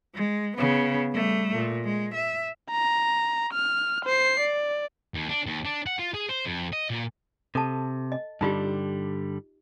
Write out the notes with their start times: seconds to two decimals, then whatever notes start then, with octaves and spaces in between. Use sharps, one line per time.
0.15 G#3
0.57 C#3 B3
1.13 G3 A3
1.56 A#2
1.84 G#3
2.14 E5
2.71 A#5
3.53 F6
4.05 C5 C7
4.40 D5
5.14 D#2
5.29 D4
5.46 D#2
5.65 D4
5.87 F#5
5.99 F4
6.14 G#4
6.29 C5
6.45 F2
6.73 D#5
6.90 A#2
7.55 C3 A4 A5
8.12 D#5
8.41 G2 D3 G3 D#4 F4 G4